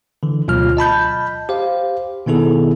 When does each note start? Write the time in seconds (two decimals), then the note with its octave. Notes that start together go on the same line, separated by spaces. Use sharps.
0.23 D3 E3
0.48 D2 B2 F#3 F4 F6
0.77 D#5 A5 B5 G6
1.49 G4 C5 F5
2.27 B2 D#3 B3 E4 G#4 A4